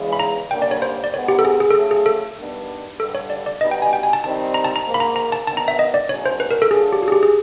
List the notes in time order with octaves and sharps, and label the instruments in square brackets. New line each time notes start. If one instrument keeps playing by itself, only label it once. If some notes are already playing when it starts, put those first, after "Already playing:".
Already playing: [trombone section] E2 C#3 E3 G#3
[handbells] B5
A#5
[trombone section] G2 D3 G3 A#3 C#4 [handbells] G5
[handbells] D5
C#5
C5
D5
[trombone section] G#2 D#3 F#3 B3 [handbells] C#5
[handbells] G4
A4
G#4
G#4
A4
[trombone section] C#3 F#3 A3 [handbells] G#4
[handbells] G#4
A4
[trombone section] G2 D#3 G3 B3 D4
[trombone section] G2 D3 G3 [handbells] A4
[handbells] C#5
D5
D5
[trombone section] B2 G3 B3 D#4 [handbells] D#5
[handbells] G5
G#5
G5
G#5
A5
[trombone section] D#3 G3 C4 D#4 [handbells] A5
[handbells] A#5
A5
A#5
[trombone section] G#2 F3 A#3
[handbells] B5
A#5
A#5
A5
[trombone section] D#3 F#3 B3 D4 [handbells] A5
[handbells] A#5
E5
D#5
D5
[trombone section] E2 B2 F#3 A3 C#4 [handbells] C#5
[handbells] C5
B4
A#4
A4
[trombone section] A#2 F#3 A3 D4 [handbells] G#4
[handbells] G4
F#4
G#4
G4
G#4